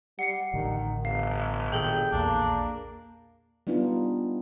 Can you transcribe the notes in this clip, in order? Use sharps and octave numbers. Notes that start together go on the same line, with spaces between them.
G3 F#5 C7 C#7
A1 A2 D3 D#3
G1 F5
A#2 D#3 G#4 A4 G5
A#1 E2 A#2 A#3 D4
G3 B3 D4 D#4 F4